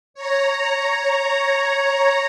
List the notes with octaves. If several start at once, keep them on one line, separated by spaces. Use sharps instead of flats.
C#5 A#5